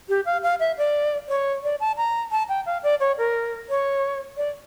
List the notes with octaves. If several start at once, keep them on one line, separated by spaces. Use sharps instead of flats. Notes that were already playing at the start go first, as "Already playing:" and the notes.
G4
F5
F5
E5
D5
C#5
D5
A5
A#5
A5
G5
F5
D5
C#5
A#4
C#5
D5